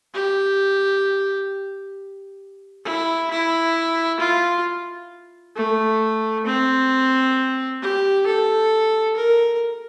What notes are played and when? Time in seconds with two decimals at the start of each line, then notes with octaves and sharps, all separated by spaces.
0.14 G4
2.85 E4
3.31 E4
4.20 F4
5.56 A3
6.46 C4
7.82 G4
8.27 A4
9.17 A#4